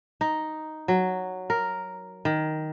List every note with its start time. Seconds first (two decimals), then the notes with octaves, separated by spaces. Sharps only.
0.21 D#4
0.88 F#3
1.50 A#4
2.25 D#3